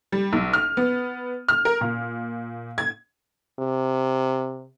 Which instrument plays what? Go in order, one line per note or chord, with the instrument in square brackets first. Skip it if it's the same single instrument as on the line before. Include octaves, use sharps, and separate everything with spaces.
[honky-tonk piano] G3
B1
F6
B3
F6
A#4
A#2
G#6
[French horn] C3